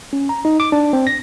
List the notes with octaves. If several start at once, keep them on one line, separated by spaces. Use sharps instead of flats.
C#4
A#5
D#4
D6
D4
C4
A#6